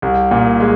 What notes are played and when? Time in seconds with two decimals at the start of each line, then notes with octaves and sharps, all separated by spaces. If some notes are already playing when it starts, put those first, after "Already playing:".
0.02 C2
0.31 A#2
0.60 G#3